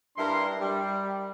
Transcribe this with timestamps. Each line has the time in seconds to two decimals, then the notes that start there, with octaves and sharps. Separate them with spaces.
0.17 G2 D4 E4 A#4 C6
0.59 G3